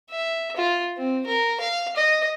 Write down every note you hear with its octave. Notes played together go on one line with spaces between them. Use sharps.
E5
F4
C4
A#4
F5
D#5